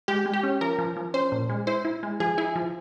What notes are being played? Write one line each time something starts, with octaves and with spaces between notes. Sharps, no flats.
G#3 G4
G#3
G4
C#4
F3 A#4
F3
F3
C#4 C5
A#2
G#3
E4 C5
E4
G#3
F3 G#4
E4 G#4
F3